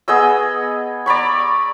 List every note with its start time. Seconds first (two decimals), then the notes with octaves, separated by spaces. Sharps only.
0.08 B3 G#4 D#5 E6
1.06 D5 A#5 B5 C#6